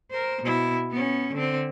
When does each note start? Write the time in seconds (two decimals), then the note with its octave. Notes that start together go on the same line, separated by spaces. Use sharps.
0.11 A#4 C5
0.42 B2 E4
0.91 B3 C#4
1.33 D3 C4